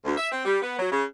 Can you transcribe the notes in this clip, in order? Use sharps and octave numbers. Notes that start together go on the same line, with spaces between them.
D2
E5
C4
G3
B3
F#3
C#3